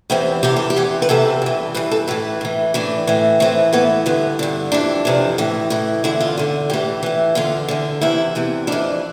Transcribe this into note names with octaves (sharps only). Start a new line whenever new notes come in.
E2 C3 E3 C4
E2 C3 E3 G4
A4
G4
E2 C3 E3
B4
E2 C3 E3 A4
G2 E3
G2 E3 B4
A4
A2 E3 B4
A2 E3
A2 E3 D4
A2 E3
A2 E3 C4
A2 E3 B3
G2 D3 B3
G2 D3
F2 C3 E3 D4
F2 C3 E3
A2 E3
A2 E3
E2 D3 E4
F4
E2 D3
A2 E3 G4
A2 E3
E2 D3 F4
E2 D3
E2 C3 E3 E4
E2 C3 E3
F2 E3 D4